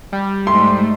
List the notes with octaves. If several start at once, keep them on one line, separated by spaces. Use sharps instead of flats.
G3
G#2 A3 C6